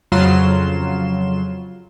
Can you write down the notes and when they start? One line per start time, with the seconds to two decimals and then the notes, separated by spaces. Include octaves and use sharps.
0.12 F2 C#3 F#3 F4 C6 E7